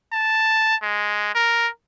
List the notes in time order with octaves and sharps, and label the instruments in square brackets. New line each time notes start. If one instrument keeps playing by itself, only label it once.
[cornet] A5
G#3
A#4